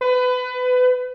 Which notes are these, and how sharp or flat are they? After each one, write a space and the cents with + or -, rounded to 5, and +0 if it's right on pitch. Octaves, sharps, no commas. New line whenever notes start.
B4 +25